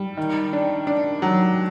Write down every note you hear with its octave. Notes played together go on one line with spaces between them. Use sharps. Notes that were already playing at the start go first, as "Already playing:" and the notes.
Already playing: G3
D#3
D4
D4
F#3